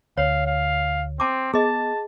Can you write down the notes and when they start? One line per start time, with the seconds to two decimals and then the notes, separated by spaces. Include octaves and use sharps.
0.17 D2 C#5 F5
0.47 F5
1.20 C4 A5 D6
1.54 B3 G#4 D#5 A5